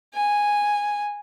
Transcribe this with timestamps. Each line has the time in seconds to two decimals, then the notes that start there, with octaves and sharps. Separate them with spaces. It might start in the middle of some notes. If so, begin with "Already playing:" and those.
0.14 G#5